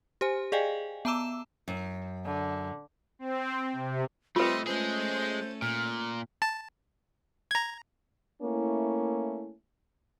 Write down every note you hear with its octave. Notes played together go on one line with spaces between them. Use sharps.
G4 C5 G#5
G#4 D5 D#5 F5 G5 G#5
B3 A5 A#5 D6 E6 E7
F#2
D3
C4
C3
G3 A3 C4 F4 B4 D#5 C6
G#3 A3 C#4 G#4 A4 C5
A#2 F6
A5
A#5 G#6
A3 A#3 C#4 E4